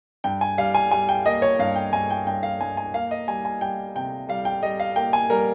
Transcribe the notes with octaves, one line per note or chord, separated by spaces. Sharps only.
G2 G5
G#5
G3 F5
G#5
G3 G#5
G5
A#3 D#5
C#5
G2 F5
G5
G2 G#5
G5
G2 G5
F5
G2 G#5
G#5
A#3 F5
D#5
G3 G#5
G#5
G3 G5
C3 G5
G3 F5
G5
G3 D#5
F5
A#3 G5
G#5
G3 A#4